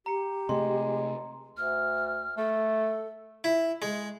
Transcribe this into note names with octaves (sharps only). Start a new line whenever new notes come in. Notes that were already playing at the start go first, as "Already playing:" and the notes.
G4 A#5 C#7
C3 G#3 A3 C6
D2 F6
A3 A4
E4
G#3